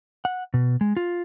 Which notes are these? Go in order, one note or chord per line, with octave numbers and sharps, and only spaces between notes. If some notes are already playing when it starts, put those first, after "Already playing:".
F#5
B2
G#3
F4